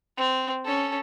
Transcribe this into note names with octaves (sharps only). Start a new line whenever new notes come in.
C4
C#4 A4